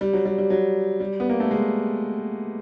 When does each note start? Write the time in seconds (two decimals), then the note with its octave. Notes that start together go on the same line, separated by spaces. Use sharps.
0.01 G3
0.13 F#3
0.25 G3
0.38 G3
0.50 F#3
1.00 G3
1.20 B3
1.29 A#3
1.40 A3
1.51 G#3